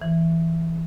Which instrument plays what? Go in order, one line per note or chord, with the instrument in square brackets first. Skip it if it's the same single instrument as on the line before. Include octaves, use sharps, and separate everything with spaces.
[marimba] E3